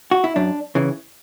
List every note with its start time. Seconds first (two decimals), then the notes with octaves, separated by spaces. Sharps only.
0.11 F#4
0.24 E4
0.36 F#2 D4
0.75 C#3 E3